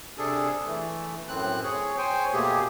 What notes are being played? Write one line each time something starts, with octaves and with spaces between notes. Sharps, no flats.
C3 D4 G#4 A4
E3 A3
F#2 A2 C4 F#6
G#4 C#5
C5 C#5 G5 G#5
B2 A3 A#3 G4 G#4